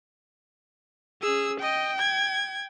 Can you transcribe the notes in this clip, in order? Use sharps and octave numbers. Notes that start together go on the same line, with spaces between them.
C#4 G#4 E6
D#5 G5
G#6